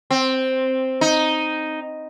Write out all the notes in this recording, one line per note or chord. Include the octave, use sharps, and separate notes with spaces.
C4
D#4